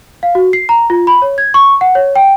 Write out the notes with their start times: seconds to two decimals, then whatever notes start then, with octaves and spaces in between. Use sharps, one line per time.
0.23 F5
0.35 F#4
0.53 C7
0.69 A#5
0.90 F4
1.07 B5
1.22 C#5
1.38 G#6
1.54 C#6
1.81 F#5
1.95 C#5
2.16 G5